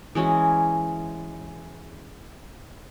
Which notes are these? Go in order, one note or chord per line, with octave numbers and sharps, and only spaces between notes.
E3 G#3 C#4 F#4